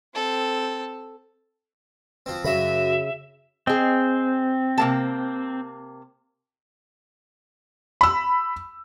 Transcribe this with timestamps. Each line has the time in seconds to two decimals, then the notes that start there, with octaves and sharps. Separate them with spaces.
0.14 C4 A4
2.26 F3 C4
2.44 F#2 C#3 F#4 E5 B5
3.67 C4 G#4 D#5
4.78 C3 A#3 A5
8.01 B5 E6